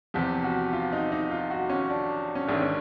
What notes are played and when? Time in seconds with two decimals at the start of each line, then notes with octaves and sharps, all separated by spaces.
0.14 E2 C3 F3 G4
0.44 F#4
0.73 F4
0.93 D#4
1.12 D#4
1.31 F4
1.50 F#4
1.70 C#4
1.89 D4
2.35 C#4
2.47 A1 G#2 D#3 D4
2.62 C#4